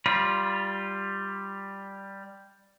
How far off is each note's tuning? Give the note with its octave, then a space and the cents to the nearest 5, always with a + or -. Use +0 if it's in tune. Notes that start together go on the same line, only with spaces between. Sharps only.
G3 +0 F4 -5 B5 -35